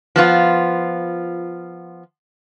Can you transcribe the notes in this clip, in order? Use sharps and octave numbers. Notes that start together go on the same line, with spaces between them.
F3 B3 F4